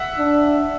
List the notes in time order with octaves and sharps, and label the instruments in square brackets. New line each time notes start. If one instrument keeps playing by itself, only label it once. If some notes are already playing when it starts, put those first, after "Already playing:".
Already playing: [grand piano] E5 F#5
[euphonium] D4